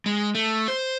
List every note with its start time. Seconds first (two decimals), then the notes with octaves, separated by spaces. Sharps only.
0.06 G#3
0.35 A3
0.68 C5